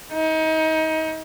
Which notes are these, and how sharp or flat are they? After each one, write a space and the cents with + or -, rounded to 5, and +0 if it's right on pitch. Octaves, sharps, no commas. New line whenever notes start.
D#4 +30